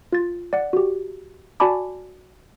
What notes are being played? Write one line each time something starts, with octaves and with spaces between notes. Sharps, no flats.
F4 A6
D5 F#5
F#4 G4
F#4 D5 G#5 A5 B5 D6